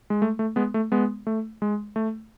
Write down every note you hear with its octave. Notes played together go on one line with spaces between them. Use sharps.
G#3
A3
A3
G#3 B3
A3
G#3 B3
A3
G#3
A3